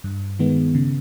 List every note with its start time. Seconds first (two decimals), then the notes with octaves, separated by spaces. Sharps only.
0.04 G2
0.39 D#3 G#3 B3
0.75 C#3